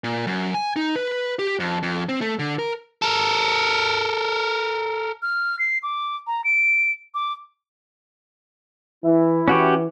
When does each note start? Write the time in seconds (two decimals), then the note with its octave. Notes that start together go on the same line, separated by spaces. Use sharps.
0.04 A#2
0.27 F#2
0.54 G#5
0.76 D#4
0.95 B4
1.39 G4
1.59 F2
1.83 F2
2.09 C4
2.21 A3
2.39 D3
2.59 A#4
3.02 A4 A#4
5.22 F6
5.59 C7
5.83 D6
6.27 A#5
6.44 D7
7.14 D6
9.04 E3 E4
9.48 E3 C#4 F#4 G4